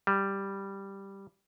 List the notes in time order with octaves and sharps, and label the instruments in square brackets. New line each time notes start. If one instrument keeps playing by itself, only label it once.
[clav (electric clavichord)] G3